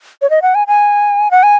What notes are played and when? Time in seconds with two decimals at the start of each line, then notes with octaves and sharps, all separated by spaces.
0.22 C#5
0.30 D#5
0.42 F#5
0.55 G#5
0.67 G#5
1.31 F#5
1.43 G#5